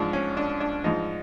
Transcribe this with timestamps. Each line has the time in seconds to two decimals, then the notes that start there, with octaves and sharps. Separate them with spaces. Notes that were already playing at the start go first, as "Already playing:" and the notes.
Already playing: G#2 F3 D4
0.13 C#4
0.37 D4
0.60 D4
0.84 G#2 F3 D#4